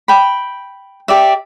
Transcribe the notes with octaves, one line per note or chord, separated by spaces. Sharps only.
G5 B5
G4 D5 E5